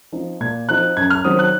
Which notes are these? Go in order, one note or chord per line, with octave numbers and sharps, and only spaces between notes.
F3 C4 D#4
A#2 G#6
F3 C4 D#4 F#6
F#2 G#6
F6
D#3 F#3 C4 D#6
F#6